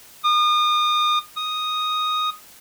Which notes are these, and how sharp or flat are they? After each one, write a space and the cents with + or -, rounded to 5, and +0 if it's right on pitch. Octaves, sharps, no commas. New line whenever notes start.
D#6 -35
D#6 +0